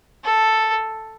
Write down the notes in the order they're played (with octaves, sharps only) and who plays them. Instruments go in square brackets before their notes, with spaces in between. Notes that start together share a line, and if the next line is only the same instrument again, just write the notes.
[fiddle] A4